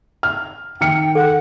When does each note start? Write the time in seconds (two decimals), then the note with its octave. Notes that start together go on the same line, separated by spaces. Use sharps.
0.23 F6
0.81 D#3 G5 F6 C#7
1.15 A4 F#5